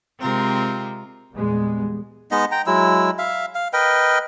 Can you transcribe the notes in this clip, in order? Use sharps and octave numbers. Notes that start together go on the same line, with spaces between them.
C3 G#3 C4 F4 A#4
E2 A#2 G3 G#3 B3
G#3 B3 D#4 D#5
G5 A#5
F#3 G#3 E4 E6
E5 F5
F5
A#4 B4 D#5 G5